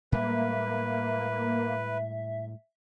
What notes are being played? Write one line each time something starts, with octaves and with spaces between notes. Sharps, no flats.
A2 G3 G#3 A#3 B4 E5